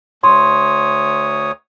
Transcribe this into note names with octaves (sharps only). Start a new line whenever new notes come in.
D2 C#5 C6 D#6